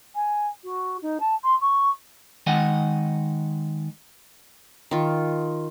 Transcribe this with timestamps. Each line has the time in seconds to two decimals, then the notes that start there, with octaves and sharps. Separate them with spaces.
0.14 G#5
0.64 F#4
1.01 D#4
1.20 A5
1.43 C6
1.61 C#6
2.47 D#3 G#3 D#5 F#5
4.91 D#3 F4